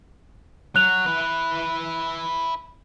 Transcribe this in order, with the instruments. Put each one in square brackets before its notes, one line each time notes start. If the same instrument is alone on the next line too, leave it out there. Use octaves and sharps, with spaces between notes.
[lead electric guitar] F#3 [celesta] F#6 F7
[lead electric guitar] E4 B4